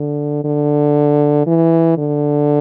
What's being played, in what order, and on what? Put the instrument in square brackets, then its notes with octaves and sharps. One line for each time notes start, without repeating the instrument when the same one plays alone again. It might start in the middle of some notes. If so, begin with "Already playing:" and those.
Already playing: [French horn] D3
D3
E3
D3